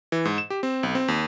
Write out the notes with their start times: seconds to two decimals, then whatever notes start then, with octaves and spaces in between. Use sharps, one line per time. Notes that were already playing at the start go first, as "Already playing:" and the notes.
0.12 E3
0.25 G#2
0.38 E7
0.50 G4
0.63 C4
0.83 B1
0.95 C4
1.08 D#2